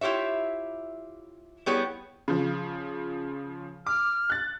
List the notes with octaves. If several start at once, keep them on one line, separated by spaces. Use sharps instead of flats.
E4 F4 G4 C#5 E5
G3 B3 E4 G4 G#4 C#5
C#3 F3
D6 F6
F#6 A6